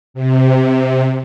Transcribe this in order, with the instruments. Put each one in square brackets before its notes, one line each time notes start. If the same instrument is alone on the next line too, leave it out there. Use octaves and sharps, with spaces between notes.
[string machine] C3